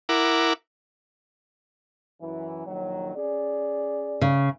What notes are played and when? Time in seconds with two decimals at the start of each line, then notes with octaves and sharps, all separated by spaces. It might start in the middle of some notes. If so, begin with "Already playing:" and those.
0.09 E4 A#4 F#5 D6
2.21 F#2 E3
2.67 A#1 D#3 F#3
3.15 C#4 G#4 D5
4.21 C#3